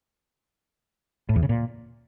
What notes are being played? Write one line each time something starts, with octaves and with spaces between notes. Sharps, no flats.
A2
E2
C#3
A#2